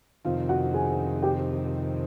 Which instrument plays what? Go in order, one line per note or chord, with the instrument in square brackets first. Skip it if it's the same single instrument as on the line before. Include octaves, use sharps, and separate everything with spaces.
[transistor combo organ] F2 C3 D#3 [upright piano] F4 F5
[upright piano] F#4 F#5
G#4 G#5
G4 G5